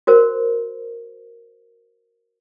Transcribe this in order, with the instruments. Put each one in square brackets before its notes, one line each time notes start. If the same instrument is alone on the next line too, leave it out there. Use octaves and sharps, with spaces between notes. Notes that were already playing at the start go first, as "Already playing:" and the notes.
[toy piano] F#4 A#4 C5